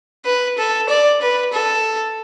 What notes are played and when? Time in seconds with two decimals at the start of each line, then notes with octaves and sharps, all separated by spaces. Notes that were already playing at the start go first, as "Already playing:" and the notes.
0.25 B4
0.58 A4
0.89 D5
1.21 B4
1.53 A4